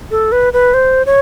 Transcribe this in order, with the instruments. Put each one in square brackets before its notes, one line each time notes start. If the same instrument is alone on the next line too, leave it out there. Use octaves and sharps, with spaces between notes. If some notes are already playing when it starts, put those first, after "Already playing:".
[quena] A4
B4
B4
C5
C#5